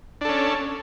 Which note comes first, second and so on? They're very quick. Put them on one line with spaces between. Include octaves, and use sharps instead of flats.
D4 A4 C#4